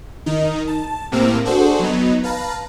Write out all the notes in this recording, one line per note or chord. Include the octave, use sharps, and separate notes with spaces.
D#3 D#4
A5
A2 C3 A#3 C4 E6 F6
D4 F#4 G#4 A4 C5
F#3 B3 D#4
B4 F5 A5 A#5